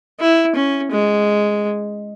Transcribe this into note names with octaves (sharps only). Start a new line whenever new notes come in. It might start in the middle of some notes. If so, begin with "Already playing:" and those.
E4
C#4
G#3